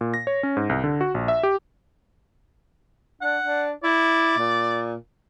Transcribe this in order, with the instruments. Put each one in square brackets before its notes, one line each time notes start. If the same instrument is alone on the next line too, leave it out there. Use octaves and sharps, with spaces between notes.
[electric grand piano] A#2
A#6
C#5
C#4
G#2
C2
D3
F#4
A#1
E5
G4
[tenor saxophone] D4 [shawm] F#5
[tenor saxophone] D4
[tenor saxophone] E4 [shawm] D5
[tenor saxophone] A#2